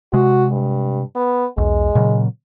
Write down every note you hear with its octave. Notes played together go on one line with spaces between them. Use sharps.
C3 G#3 F#4
G2
B3
B1 E2 G#3
A#2 C#3 F#3